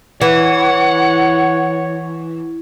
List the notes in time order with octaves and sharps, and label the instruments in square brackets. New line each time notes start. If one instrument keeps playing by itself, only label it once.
[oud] E3 [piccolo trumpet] C#5 [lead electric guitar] F#5